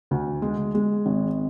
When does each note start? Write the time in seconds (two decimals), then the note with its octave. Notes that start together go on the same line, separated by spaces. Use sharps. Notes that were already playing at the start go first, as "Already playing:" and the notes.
0.11 D2
0.42 G#3
0.75 G#3
1.06 G#1